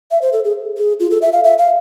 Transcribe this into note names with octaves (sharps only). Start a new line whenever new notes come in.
E5
C5
A4
G#4
G#4
F4
A4
E5
F5
E5
F5